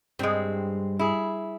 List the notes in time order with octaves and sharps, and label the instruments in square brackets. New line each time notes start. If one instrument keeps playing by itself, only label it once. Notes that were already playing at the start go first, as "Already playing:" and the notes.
[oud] G2 [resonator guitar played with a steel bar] G#3 C4
[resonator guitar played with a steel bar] E4 G#4